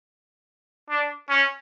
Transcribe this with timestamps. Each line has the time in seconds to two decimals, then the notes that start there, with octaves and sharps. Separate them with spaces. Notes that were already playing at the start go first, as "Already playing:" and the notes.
0.90 D4
1.29 C#4